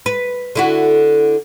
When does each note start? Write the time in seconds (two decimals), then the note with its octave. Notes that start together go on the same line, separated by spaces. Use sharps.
0.06 B4
0.55 D3 E4 F#4